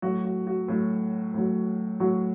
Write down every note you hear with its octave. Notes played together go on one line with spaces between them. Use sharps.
A2 F#3 F#4
F#4
F#4
A2 F#3
A2 F#3
A2 F#3 F#4